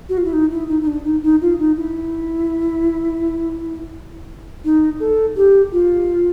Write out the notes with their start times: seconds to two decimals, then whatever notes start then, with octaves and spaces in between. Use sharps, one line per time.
0.09 F#4
0.17 F4
0.24 E4
0.33 D#4
0.51 E4
0.68 D#4
0.81 D#4
0.87 D4
1.04 D#4
1.23 D#4
1.41 F4
1.59 D#4
1.77 E4
4.64 D#4
5.00 A4
5.36 G4
5.72 F4